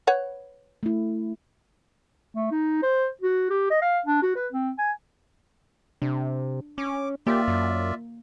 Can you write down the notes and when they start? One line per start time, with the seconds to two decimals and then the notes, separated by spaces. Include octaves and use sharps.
0.07 B4 C#5 F#5
0.83 A3 E4
2.35 A3
2.51 D#4
2.83 C5
3.21 F#4
3.50 G4
3.70 D#5
3.82 F5
4.06 D4
4.22 F#4
4.36 B4
4.52 C4
4.78 G#5
6.02 C3 D4
6.78 C#4 D6
7.27 A#3 F4 G4 D5 E5
7.48 F#2